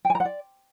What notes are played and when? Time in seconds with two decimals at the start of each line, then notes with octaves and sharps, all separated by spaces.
0.05 G5
0.10 G#5
0.15 A#5
0.20 F#5
0.25 D5